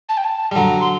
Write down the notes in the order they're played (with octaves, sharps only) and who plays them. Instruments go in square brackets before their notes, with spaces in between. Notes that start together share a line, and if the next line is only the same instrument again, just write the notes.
[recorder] A5
G5
A5
[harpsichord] G3
[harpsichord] D3 F#3 [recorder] A#5
[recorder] C6